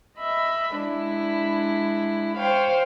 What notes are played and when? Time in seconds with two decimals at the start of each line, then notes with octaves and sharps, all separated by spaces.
0.18 D#5 E5 B5
0.77 G#3 D4 E4
2.37 C5 C#5 F5 G5